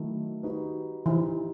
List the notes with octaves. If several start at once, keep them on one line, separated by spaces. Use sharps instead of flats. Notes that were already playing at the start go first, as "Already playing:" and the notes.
Already playing: D#3 F#3 A3 E4
G3 D#4 F#4 B4
E3 G3 D#4 G4 C5